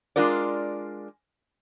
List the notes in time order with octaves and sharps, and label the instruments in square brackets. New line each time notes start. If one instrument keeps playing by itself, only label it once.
[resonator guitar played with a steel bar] G#3 D4 F4 A#4 D5